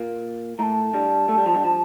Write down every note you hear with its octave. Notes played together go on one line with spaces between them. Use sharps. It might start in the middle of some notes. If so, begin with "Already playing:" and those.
Already playing: A#2 A#3
A2 A3 A5 A#5
G2 G3
A3
G3
F3
G2 G3
F3